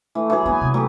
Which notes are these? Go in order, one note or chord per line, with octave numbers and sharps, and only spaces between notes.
E3 A3
E3 F#3 G#4
A#3 B3 G#5
C3
F#3 A3 G4